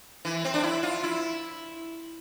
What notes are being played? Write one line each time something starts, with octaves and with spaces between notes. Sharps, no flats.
E3
C4
D4
E4
F4
E4